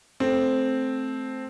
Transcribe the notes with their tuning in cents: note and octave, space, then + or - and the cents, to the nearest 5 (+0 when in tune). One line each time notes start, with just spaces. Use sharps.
A3 -10 C4 +0